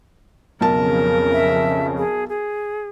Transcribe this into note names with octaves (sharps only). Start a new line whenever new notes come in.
B1 F2 C#3 A#4 A5
E5
G#4
G#4